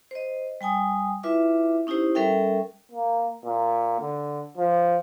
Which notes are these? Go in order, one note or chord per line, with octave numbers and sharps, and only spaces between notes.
C5 D#5
G3 G5 G#5 D#6
E4 F4 B4 E5 D6
C#4 D#4 E4 G4 C5
G3 C#4 A4 A#4 E5 G5
A#3
A#2
D3
F3